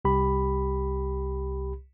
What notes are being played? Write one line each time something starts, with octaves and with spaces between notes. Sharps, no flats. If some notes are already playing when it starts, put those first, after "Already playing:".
C2 G4 B5